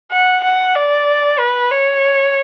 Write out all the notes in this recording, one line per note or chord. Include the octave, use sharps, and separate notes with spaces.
F#5
F#5
D5
B4
C#5